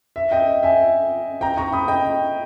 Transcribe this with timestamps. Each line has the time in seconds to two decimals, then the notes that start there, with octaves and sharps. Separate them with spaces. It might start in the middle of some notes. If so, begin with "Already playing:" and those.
0.16 E5
0.31 D#5 G5
0.63 E5 G#5
1.41 G5 A#5
1.57 A#5 C#6
1.73 B5 D#6
1.88 D#5 G5